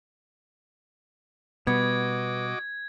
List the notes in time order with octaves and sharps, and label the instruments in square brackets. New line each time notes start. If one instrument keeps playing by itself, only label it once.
[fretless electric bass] B2 G3 [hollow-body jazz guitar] B3 [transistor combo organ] F#4 D#5 D6 [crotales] G#6